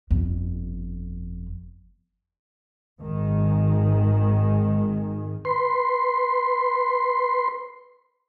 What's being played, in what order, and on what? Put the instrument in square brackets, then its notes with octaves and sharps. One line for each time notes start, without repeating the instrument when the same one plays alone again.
[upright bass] G1 F2
[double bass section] G#1 D#3 G#3
[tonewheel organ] B4 C6